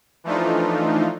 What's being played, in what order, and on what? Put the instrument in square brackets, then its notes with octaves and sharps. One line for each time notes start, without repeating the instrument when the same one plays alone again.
[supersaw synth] E3 F3 A3 D4 D#4 F4